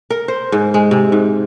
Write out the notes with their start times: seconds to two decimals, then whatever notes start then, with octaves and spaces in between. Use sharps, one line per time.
0.10 A#4
0.28 C5
0.52 G#2
0.74 G#3
0.91 C3
1.12 G#2